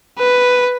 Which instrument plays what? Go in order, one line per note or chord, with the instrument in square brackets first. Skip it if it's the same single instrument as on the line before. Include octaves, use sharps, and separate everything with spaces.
[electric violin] B4